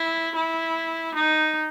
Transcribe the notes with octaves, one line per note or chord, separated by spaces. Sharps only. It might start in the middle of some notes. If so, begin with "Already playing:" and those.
Already playing: E4
E4
D#4